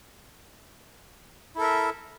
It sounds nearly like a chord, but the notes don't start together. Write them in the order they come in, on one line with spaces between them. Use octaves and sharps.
E4 A4 A#4 E5